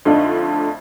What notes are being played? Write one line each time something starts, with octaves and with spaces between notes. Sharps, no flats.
F2 D3 A3 D4 D#4 F4